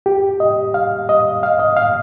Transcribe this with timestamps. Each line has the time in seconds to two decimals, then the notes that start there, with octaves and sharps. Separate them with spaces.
0.06 G4
0.40 D#5
0.74 F5
1.09 D#5
1.43 F5
1.59 D#5
1.77 F5